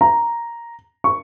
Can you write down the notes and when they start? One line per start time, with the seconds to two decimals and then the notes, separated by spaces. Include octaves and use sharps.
0.01 A#5
1.04 C#6